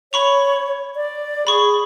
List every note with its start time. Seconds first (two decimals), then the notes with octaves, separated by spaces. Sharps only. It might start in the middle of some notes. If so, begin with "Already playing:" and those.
0.13 C#5 B5 C#6 F7
0.95 D5
1.47 G#4 B5 C#6